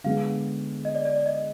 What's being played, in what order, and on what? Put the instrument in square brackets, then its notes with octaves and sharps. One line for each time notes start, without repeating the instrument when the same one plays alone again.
[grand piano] D3 G#3 B3 [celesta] F5
[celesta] D#5
D5
D5
D5
D#5